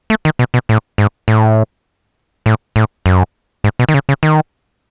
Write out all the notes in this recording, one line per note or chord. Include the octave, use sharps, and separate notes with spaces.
A3
D#3
B2
B2
A2
G#2
A2
A2
A2
F#2
G#2
B2
D#3
C#3
C#3
D#3